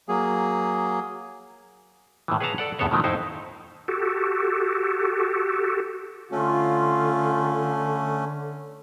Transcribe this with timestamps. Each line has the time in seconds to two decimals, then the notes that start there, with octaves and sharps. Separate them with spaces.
0.09 F#3 A#3 G#4
2.28 A2 D#3 E3
2.40 G#4 B4 C#5 F5 A5 A#5
2.58 A4 D5 F#5
2.79 E2 A2 B3 A4 C#5 D#5
2.91 B2 D#3 F3 F#3 A3
3.04 F2 A2 D#4 E4 C5
3.88 F#4 G4 A4
6.32 D3 A3 C#4 F4